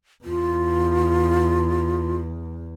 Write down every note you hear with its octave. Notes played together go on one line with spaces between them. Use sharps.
E2 F4